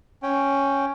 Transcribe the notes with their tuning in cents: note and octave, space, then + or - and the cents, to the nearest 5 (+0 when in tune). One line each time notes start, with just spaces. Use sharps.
C#4 +0 G5 +0